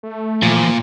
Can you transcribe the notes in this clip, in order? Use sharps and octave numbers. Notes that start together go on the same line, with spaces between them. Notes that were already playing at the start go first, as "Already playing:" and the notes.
A3
A#2 E3 F3